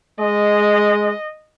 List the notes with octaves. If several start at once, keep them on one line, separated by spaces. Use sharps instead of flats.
G#3 D#5